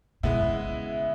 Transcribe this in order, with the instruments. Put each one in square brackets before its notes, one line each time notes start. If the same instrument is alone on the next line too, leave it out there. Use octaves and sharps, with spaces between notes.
[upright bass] C#3 [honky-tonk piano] G#3 B3 E4